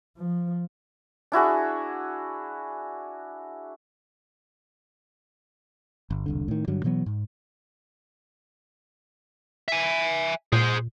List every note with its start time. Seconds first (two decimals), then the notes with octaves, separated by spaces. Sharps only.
0.18 F3
1.32 D4 E4 F#4 G#4
6.10 G1
6.26 E1 C2 D3
6.48 A2 D#3
6.67 G2 D3 F#3
6.84 B2 E3 F#3 B3
7.06 G#2
9.68 E5 G#5
10.52 A#2 G#4 C5